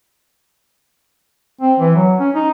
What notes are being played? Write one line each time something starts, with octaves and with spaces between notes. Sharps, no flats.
C4
E3
F#3
C#4
D#4